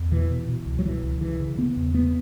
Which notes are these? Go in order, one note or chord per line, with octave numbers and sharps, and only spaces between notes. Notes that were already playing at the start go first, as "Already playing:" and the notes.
Already playing: E2
B2 E3
B2
B2
C#2
F#3
B2 E3
C#2
C#3 E3
C#3
C#3 B3
E2
C#3 B3